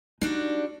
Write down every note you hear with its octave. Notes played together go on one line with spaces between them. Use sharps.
G3 D4 D#4 F#4